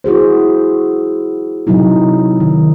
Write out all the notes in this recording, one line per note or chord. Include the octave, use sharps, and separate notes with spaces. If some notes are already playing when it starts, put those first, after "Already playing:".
E4 F#4 G#4 C5
C3 F#3 D#4 E4
D#3